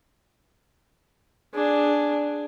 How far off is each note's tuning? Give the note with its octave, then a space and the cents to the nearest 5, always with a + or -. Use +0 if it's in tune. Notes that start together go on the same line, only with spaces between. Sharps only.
D4 +0 G#4 +0